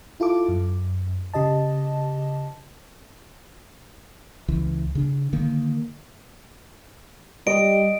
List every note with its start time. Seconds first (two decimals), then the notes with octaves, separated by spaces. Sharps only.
0.20 E4 F4 A4 D6
0.49 F#2
1.34 C#3 G4 D#5 A5
4.48 C#2 E3
4.95 C#3 D4
5.33 D3 D#3 A#3
7.47 G3 D#5 D7